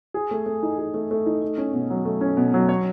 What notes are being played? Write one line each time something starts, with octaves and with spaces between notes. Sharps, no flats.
G#4
A3
A3
D#4
G#4
A3
A3
D#4
A3
C#4
B2
F#3
A3
C#4
B2
F#3
C#5